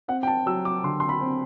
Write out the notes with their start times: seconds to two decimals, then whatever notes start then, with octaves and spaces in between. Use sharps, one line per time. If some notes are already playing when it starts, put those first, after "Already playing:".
0.08 C4 F#5
0.23 G5
0.27 A5
0.46 F#3 E6
0.65 D6
0.83 D3 C6
1.00 C6
1.09 B5
1.21 C4